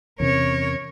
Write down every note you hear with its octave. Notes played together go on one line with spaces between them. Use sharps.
E2 C3 C#4 A#4 C#5